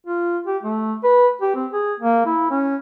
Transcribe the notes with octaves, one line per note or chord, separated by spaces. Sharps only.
F4
G4
A3
B4
G4
C4
G#4
A#3
E4
C#4